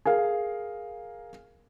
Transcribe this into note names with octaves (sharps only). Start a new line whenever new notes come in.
G#4 A#4 F5